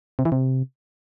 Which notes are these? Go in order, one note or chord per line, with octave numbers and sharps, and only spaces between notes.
C3
E3
C3